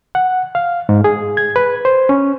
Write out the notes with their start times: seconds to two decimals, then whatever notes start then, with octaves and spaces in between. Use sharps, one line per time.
0.15 F#5
0.55 F5
0.89 G#2
1.04 G#4
1.37 G#6
1.56 B4
1.85 C5
2.09 C#4